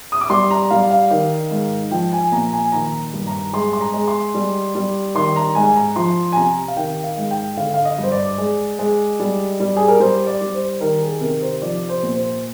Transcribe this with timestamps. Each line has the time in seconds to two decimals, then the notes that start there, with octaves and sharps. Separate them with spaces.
0.12 D#6
0.21 D6
0.30 G3 C6
0.51 A#5
0.70 G3 F5
0.90 F5
1.11 D#3
1.51 G#2
1.91 F3 G5
2.13 G#5
2.32 A#2 A#5
2.53 G#5
2.72 D#3 A#5
3.13 G2
3.27 A#5
3.53 G#3 C6
3.73 C6
3.81 A#5
3.94 G#3
4.08 C6
4.34 G3
4.75 G3
5.15 D#3 C6
5.36 A#5
5.55 G#2 G#5
5.76 A#5
5.96 F3 C6
6.32 G#5
6.36 C3 A#5
6.68 F5
6.76 D#3 G5
7.04 F5
7.17 G#2
7.31 G5
7.57 D3 F5
7.74 F5
7.85 D#5
7.98 G2 C5
8.12 D5
8.38 G#3
8.79 G#3
9.20 G3
9.60 G3
9.77 G#4
9.88 A#4
10.00 G3 C5
10.27 D5
10.41 G3
10.54 C5
10.80 D#3 A#4
11.02 G#4
11.21 C3 A#4
11.41 C5
11.62 F3 D5
11.89 C5
12.03 A#2
12.16 C5